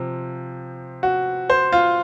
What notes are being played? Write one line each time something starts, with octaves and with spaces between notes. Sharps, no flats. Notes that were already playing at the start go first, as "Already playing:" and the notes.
Already playing: C3 F3
F#4
C5
F4